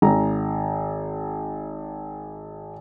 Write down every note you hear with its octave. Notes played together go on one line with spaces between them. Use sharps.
G#1 A#5